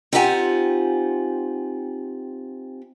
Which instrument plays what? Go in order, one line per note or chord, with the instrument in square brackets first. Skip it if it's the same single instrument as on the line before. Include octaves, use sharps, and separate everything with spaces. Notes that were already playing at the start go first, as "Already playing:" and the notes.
[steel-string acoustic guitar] C4 D#4 F4 G4 F#5 G#5